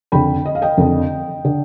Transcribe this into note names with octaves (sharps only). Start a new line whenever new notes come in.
F2 D3 G5 B5
D#5
F5
D#5 G5
F2 D3
D3